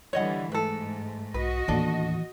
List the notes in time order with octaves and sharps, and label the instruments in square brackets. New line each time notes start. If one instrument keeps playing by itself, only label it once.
[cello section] D3 E3 G3 [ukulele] C#5 D#5 F#5
[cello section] G#2 A3 [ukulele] A4 B4
[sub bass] B1 [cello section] F#4 D#5 [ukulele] B4
[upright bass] D#2 A2 [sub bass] E3 [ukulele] D4 A4